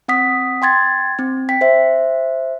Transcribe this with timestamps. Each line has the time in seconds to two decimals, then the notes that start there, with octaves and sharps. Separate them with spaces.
0.08 C4 F#5 D#6 B6
0.62 G5 C6 G#6 A6
1.19 C4
1.49 G5 B6
1.61 C5 E5